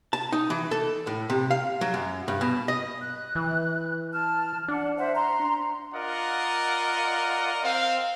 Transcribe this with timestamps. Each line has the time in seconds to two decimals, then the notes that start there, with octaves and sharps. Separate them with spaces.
0.13 A5
0.32 D#4
0.50 E3
0.71 A4
1.07 A2
1.30 C3
1.51 F5
1.81 F#3
1.94 F#2
2.28 G2
2.41 B2
2.68 D#5
3.01 F#6
3.35 E3
4.13 A5 F6
4.68 D4 F#5
4.98 C5 E5 F#5
5.15 A#5 C6
5.94 F4 A#4 D5 D#5 F#5
7.64 C4 F5